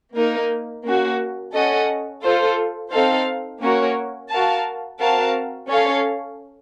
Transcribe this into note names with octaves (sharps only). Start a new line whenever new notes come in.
A#3 D#4 A#4
A#3 C#4 F#4
C#4 A4 D#5 F#5
F4 A4 C5
C4 D#4 A4 C5 F5
A#3 C#4 F#4 A#4 C#5
F#4 A#4 F5 A5
C4 F#4 A#4 F5 A5
C#4 A4 C#5 F5